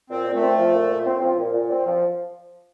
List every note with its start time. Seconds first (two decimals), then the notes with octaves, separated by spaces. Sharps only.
0.10 A#2 C4
0.26 A#2
0.34 A3
0.42 C4
0.58 F3
0.74 A#2
0.90 A#2
1.06 C4
1.22 F3
1.39 A#2
1.54 A#2
1.70 C4
1.86 F3